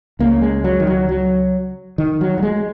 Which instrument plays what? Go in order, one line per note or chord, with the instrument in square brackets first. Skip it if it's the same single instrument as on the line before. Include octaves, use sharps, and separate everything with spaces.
[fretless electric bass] C#2 C#3 A#3
G#3
F#3
D#3
F#3
F#3
D#3
F#3
F#3
G#3